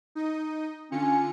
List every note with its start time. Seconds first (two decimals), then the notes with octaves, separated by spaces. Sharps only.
0.15 D#4 D#5
0.92 D3 C#4 F4 C#7